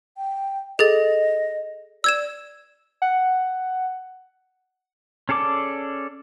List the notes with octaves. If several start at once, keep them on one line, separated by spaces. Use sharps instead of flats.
G5
G#4 A4 D#5 A6
D5 E6 G#6 E7
F#5
C#4 G#4 A4 D5 D6